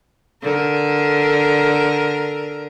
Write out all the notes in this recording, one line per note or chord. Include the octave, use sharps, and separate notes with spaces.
D3 A#4